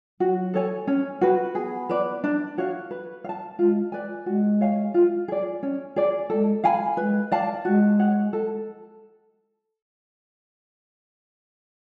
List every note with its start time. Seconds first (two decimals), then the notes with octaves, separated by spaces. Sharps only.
0.20 F#3 F#4
0.54 A4 C#5 G#5
0.87 C#4
1.21 F#4 B4
1.55 B3 G#4
1.89 B4 D5
2.24 D4
2.58 F#4 C#5 F5
2.91 B4
3.24 F5
3.29 A5
3.58 G#3 F4
3.92 B4 D5 G#5
4.26 G#3 F#4
4.61 C#5 F5 G#5
4.94 F4
5.28 G#4 D5
5.63 C#4
5.96 G#4 D5
6.30 G#3 A4
6.64 F5 G#5 B5
6.97 G#3 B4
7.32 D5 F5 A5
7.65 G#3 F#4
7.99 C#5 F#5
8.33 A4